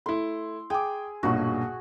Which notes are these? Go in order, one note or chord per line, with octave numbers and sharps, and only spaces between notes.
A3 E4 C6
G#4 G5 D6
B1 G2 A#2 F#4 C#6